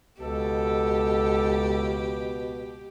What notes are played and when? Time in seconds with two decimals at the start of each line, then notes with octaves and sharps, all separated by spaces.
0.21 C#2 B2 G4 A4